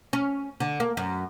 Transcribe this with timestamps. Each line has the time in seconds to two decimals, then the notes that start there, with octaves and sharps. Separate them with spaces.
0.13 C#4
0.60 D3
0.80 A#3
0.97 F#2